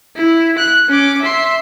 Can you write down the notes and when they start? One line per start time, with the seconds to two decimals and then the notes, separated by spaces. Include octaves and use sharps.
0.16 E4
0.58 F#6
0.89 C#4 D6
1.22 E5 C6